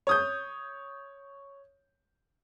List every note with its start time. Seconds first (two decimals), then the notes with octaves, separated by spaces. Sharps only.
0.07 C#5 D#6 G6